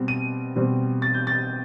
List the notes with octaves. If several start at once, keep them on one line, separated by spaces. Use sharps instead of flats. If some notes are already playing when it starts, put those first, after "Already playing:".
Already playing: B2 G3 C4
D#7
B2 G3 C4
A6
G6
A6